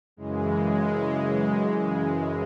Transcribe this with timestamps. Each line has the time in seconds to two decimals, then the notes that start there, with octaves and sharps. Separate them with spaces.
0.17 F#2 C#3 E3 G#3
0.67 G#3
1.18 G#3
1.69 G#3